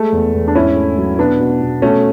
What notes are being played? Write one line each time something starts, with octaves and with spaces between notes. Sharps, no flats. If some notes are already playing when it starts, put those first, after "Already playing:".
Already playing: G#3 A3
E2
E2
D4
G#2 C#4 E4
A3
F#3
B2 B3 D4
B2
B2
B2 A3 C#4